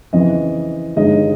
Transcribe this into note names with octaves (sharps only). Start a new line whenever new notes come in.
F2 C#3 E3 D#5
G1 G2 D#3 G#3 D#5